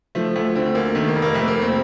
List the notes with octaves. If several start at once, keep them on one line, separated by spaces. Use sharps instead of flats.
F3 A3
D2 A3
D3 C4
D2 A#3
D#3 A3
A#3
F1
A#3
F2 A3
A#3
F1
C4